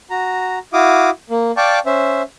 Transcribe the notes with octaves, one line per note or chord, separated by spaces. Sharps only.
F#4 A#5
E4 F#4 F5 D6 D#6
A#3
D5 F5 G5 A5 C#6 D6
C#4 C5 E5